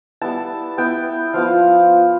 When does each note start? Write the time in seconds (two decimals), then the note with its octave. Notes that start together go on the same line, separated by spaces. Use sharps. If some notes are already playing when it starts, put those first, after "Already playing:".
0.21 G3 B3 E4 A5
0.78 B3 E4 G5
1.34 F3 B3 F4 F5